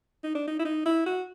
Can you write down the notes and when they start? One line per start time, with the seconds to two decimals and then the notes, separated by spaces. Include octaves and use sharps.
0.24 D#4
0.35 D4
0.48 D#4
0.59 E4
0.65 D#4
0.85 E4
1.06 F#4